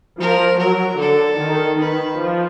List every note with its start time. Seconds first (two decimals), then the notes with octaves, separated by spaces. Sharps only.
0.20 F3 A#4
0.59 F#3 A#4
1.00 D3 A4
1.39 D#3
1.80 D#3 B4
2.19 F3